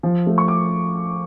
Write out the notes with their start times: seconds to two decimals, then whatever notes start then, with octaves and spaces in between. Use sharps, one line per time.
0.03 F3
0.27 A3
0.38 C#6
0.48 D6